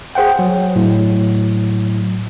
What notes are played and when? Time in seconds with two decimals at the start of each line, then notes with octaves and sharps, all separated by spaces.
0.15 G#4 C5 F#5 G5
0.39 F#3
0.76 A2 F#3